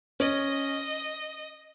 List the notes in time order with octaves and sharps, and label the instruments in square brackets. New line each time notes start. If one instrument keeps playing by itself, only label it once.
[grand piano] C#4 [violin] D#5